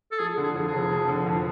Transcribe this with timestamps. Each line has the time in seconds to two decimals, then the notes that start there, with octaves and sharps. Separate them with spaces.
0.12 A4
0.19 F3 G#4
0.37 D3
0.43 G#4
0.55 F2
0.67 G#4
0.72 F1
0.91 F3
1.08 D3
1.26 F2